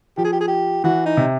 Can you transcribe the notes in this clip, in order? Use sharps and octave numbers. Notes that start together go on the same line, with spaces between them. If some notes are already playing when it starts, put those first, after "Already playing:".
F3 G4
G#4
G4
G#4
G4
E3 F#4
D#4
C3